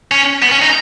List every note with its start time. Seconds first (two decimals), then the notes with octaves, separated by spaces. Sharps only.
0.11 C#4
0.42 B3
0.52 C#4
0.62 D#4